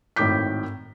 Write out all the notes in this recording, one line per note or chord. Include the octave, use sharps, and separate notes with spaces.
G#1 A2 D#3 D6 G6 B6